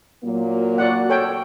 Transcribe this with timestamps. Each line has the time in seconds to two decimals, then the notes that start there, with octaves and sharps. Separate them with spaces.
0.24 A#2 F#3 A#3
0.78 F#4 D5 F#5
1.09 A4 C#5 G5